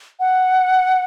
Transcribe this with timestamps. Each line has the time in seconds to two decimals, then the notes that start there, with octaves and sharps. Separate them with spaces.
0.20 F#5